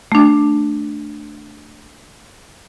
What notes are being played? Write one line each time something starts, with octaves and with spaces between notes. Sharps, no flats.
A3 D4